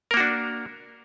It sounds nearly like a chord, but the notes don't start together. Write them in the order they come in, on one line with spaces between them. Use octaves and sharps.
A#4 A#3 F#4 D4